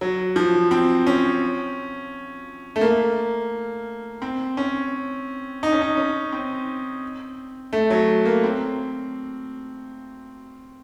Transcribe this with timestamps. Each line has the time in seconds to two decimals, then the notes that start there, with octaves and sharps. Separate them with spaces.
0.01 F#3
0.36 F3
0.71 C4
1.07 C#4
2.76 A3
2.81 A#3
4.22 C4
4.57 C#4
5.63 D#4
5.72 C#4
5.82 D#4
5.97 C#4
6.32 C4
7.73 A3
7.90 F#3
8.25 A#3
8.44 C4